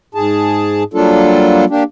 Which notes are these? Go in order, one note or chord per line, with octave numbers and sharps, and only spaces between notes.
G#2 G#4 A5
F#3 G3 A#3 D4 F4 A4
A#3 D4 G4